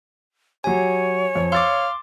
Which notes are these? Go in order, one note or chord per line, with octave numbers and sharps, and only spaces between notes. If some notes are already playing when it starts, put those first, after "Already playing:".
F#3 G4 C#5 G#5
F2
F5 C6 D6 E6 A6